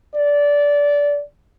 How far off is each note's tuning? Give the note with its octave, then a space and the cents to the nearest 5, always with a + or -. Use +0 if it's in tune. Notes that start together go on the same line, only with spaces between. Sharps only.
D5 -20